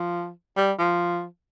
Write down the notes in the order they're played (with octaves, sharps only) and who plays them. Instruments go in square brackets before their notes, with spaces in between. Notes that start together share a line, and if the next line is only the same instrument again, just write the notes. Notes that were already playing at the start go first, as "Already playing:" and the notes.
Already playing: [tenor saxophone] F3
G3
F3